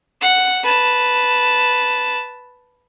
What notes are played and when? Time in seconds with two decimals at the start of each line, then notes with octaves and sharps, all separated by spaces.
0.21 F#5
0.64 B4 A5